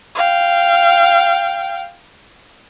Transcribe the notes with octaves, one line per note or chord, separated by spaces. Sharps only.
F5 G5